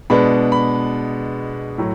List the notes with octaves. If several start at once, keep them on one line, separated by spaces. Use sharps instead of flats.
B2 G#3 B3 D4 B5
B5
A2 F#3